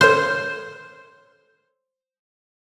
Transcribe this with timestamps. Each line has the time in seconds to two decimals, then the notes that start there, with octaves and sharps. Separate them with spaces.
0.01 A4 C5 C#5 F6